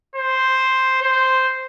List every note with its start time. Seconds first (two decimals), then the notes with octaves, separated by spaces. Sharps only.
0.15 C5
1.02 C5